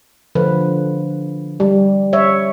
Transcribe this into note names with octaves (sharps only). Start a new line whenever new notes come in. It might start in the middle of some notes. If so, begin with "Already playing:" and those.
D3 F3 B4
G3
C#5 E5